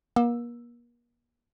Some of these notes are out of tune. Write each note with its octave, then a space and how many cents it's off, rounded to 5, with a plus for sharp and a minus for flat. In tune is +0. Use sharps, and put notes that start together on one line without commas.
A#3 +40 E6 +0